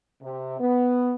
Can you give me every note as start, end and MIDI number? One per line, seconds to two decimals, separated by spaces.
0.23 0.58 48
0.60 1.15 59